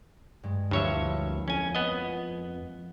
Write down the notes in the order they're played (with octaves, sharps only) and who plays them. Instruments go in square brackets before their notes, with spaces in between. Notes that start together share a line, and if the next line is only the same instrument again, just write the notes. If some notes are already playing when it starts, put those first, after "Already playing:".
[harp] G2 G#3
[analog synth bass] D2 [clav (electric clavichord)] G2 C#5 E5 [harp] F3 A#3 E4
[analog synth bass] F2 [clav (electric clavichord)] C#4 G#5
[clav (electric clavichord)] B3 D#5